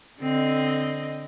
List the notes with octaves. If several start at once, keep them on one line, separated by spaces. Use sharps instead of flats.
D3 C4 D#5